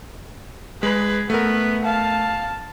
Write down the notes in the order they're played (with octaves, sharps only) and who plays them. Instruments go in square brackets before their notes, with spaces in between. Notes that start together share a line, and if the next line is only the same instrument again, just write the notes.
[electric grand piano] G#3 [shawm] G#4 [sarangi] B4
[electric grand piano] A3 A#4 [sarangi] B3 [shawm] B4
[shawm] F5 [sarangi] A5